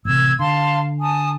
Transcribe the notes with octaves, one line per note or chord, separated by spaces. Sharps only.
A1 C3 E6 G#6
D3 F5 A5 C6
G#5 A5 D#6